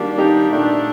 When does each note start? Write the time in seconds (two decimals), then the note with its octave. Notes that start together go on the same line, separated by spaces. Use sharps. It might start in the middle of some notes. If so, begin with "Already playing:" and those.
Already playing: D#3 G3 A#3 D4 F#4
0.18 D#4 G4
0.50 A#2 A3 D4